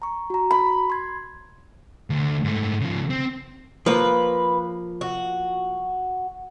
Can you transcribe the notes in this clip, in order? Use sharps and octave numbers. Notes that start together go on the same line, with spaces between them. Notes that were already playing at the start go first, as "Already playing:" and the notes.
A#5 C#6
F#4 A#5
B5
C6 G#6
D2
G#2 A3
C#3 F3
C4
F3 A#3 B4
F#4